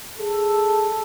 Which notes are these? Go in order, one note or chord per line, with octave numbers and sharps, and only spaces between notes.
G#4 A4